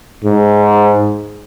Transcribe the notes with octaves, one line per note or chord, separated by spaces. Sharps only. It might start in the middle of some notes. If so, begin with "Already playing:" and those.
G#2